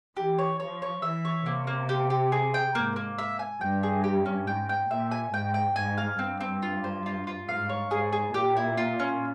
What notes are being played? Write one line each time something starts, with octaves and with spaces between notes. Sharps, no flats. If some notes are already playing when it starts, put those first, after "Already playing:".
E3 G4
C#5
F3 C#5
C#5
E3 E5
C#5
C3 A#3
A#3
G4
G4
G#4
G5
G#2 A#3
A#3
E5
G#5
G2 G5
G#4
G4
C#4
G#2 G5
G5
A#2 E5
G#5
G#2 G5
G5
G#2 G#5
F5
G2 C4
C4
F4
C5
F4
F4
G#2 F5
C#5
G#2 G#4
G#4
A#2 G4
E4
F4
C#4